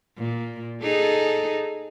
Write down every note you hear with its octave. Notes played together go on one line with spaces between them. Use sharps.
A#2
D#4 G#4 A4